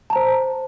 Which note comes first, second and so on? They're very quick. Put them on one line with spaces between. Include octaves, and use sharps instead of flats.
A5 A#5 C5